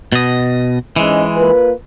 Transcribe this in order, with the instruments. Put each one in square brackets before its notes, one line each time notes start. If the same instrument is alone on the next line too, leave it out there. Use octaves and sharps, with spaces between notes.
[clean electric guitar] B2 D#5
[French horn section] G#2 C#4 D#5 [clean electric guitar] E3 G#3
[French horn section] A#3 F4 B4